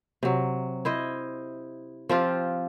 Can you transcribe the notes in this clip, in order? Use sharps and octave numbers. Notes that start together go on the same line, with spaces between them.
C3 F#3
E4 C5 D#5
F3 C4 F4 G4